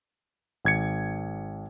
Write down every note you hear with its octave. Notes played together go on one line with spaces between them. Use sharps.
G#1 G#6 C#7